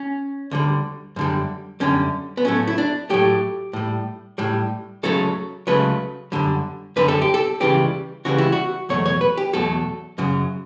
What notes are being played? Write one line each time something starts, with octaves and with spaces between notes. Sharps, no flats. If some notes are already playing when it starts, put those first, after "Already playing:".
Already playing: C#4
D2 D3 G3
F#2 D3 G3
F#2 D3 G3 C#4
B3
A2 F#3 A3 C#4
E4
D4
A2 F#3 A3 G4
A2 G3
A2 G3
C#2 C#3 F#3 A3 A4
C#2 C#3 F#3 A3 B4
F#2 D3 G3
F#2 D3 G3 B4
A4
G4
A4
C#2 C#3 E3 G3 G4
C#2 C#3 E3 G3 F#4
E4
F#4
E2 B2 F#3 A3 C#5
C#5
B4
G4
E2 B2 F#3 A3 A4
F#2 C#3 F#3